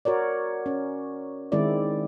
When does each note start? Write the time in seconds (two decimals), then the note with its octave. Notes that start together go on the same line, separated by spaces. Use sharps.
0.05 F#4 A#4 C#5 D5
0.66 C#4
1.52 D#3 G#3 C4 E4 D5